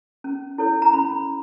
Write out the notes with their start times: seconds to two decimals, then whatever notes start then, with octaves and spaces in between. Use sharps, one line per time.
0.24 C#4
0.58 E4 A4 C#5
0.82 A#5
0.93 C#4 B5